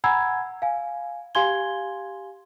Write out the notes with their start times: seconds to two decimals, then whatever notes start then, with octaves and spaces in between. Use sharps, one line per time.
0.04 F#5 G#5 A#5 B5 E6 G#6
0.62 F5 G#5
1.35 G4 F5 G#5 C6 G#6 G7